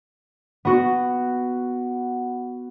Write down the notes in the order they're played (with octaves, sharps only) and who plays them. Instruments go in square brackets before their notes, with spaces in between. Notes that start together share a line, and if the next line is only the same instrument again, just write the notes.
[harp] B3 F#4